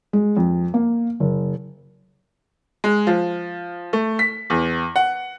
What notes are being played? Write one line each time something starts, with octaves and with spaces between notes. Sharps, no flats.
G#3
F2
A#3
F#1
G#3
F3
A3
B6
E2
F#5